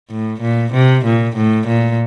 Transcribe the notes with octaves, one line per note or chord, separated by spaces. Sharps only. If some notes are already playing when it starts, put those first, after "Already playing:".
A2
A#2
C3
A#2
A2
A#2